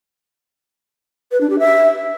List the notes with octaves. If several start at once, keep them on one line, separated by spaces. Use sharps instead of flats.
B4
D4
G4
E5